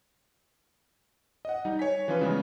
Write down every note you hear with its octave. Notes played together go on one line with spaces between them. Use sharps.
D#5 F#5
G3 D#4
C#5 G#5 B6
E3 F3 C#4 F4 B4
C#3 G3 G#3 B3